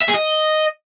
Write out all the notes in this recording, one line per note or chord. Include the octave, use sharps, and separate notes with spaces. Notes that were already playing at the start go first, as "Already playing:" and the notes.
E5
G#4
D#5